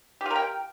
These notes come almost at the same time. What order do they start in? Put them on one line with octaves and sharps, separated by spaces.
G4 F4 A#4 G5